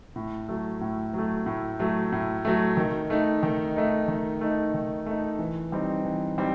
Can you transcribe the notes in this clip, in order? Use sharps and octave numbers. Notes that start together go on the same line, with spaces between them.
A2
F#3 A3
A2
F#3 A3
A2
F#3 A3
A2
F#3 A3
D#3
A3 D#4
D#3
A3 D#4
D#3
A3 D#4
D#3
A3 D#4
E3
G3 C4 D#4
E3
G3 C4 D#4